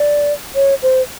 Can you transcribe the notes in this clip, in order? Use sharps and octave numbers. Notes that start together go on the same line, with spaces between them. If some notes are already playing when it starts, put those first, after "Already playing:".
Already playing: D5
C#5
C5